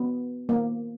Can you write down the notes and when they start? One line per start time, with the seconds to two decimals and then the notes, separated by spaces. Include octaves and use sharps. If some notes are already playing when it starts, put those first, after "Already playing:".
Already playing: B3
0.49 A#3